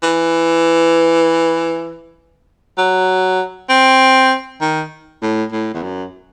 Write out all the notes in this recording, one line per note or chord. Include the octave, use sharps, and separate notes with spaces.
E3
F#3
C4
D#3
A2
A2
E2
F#2